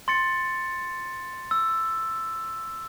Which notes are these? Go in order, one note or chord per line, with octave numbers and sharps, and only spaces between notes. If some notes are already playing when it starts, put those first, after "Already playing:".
C6 A6 C#7
E6